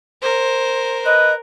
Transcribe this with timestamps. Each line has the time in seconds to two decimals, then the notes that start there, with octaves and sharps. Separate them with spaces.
0.22 A#4 C5
1.05 B4 D#5